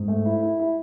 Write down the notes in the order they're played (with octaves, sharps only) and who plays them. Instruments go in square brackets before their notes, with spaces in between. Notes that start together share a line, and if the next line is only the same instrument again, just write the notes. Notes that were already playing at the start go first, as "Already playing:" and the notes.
Already playing: [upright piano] G#2
A3
E4
E4
E4